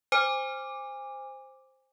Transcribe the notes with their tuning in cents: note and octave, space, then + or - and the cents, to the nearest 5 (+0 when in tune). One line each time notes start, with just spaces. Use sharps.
C5 +0 G#5 -30 D6 +0